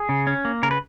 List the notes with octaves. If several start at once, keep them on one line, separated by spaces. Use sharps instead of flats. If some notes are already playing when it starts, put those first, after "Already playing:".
Already playing: G#4
C#3
C#4
A#3
C#3 A#4
B4